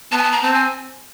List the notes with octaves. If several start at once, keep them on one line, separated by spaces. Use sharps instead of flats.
B3 A5
G#5
A5
A#5
C4 A5
G#5